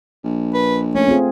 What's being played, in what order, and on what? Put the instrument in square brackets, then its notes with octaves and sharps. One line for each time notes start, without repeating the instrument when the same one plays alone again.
[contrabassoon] A#1
[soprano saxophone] B4
[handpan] A3 [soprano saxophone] C#4
[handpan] C4 F4 G#4